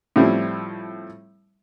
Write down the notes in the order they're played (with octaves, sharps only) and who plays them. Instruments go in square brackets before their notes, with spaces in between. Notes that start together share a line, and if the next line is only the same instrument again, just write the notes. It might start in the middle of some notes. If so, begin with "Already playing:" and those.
[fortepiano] A2 F3 G3 C4 E4